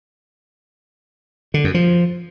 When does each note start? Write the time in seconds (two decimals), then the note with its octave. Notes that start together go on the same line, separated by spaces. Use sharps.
1.54 D3
1.64 F#2
1.74 F3